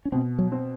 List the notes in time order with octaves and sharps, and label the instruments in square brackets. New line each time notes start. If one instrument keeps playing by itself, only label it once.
[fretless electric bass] C#4
[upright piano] B2 [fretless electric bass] C4
[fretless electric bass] F#3
[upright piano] C4